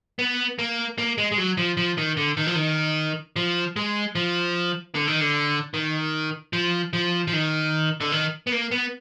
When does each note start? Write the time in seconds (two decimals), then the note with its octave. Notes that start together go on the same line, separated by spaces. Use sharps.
0.19 B3
0.59 A#3
0.98 A#3
1.18 G#3
1.32 G#3
1.38 F#3
1.58 F3
1.77 F3
1.98 D#3
2.17 D3
2.37 D#3
2.47 F3
2.55 D#3
3.36 F3
3.76 G#3
4.15 F3
4.95 D3
5.08 D#3
5.21 D3
5.74 D#3
6.53 F3
6.93 F3
7.28 F3
7.33 D#3
8.01 D3
8.12 D#3
8.47 B3
8.52 A#3
8.71 B3